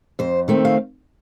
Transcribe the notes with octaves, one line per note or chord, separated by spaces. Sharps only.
F2 C5
D#3 A3 C4
F5